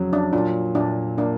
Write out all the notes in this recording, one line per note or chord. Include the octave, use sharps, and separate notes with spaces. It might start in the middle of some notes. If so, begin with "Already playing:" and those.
Already playing: F2 C#3 F#3
D4
A#2 D4
A#2 D4
A#3 D4